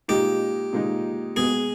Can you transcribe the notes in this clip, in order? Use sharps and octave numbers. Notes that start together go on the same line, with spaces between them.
A#2 G#3 D#4 G4
A#2 G#3 D#4
B2 G#3 B3 G#4